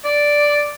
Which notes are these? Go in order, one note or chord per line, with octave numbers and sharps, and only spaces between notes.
D5